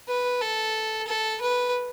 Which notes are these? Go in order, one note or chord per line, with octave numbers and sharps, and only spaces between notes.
B4
A4
A4
B4